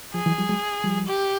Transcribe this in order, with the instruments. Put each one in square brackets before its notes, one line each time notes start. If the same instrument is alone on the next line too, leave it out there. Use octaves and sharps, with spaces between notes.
[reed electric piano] F3 [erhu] G#4
[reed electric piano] E3 F#3
F3 G3
F#3 G#3
F3 G3
[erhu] G4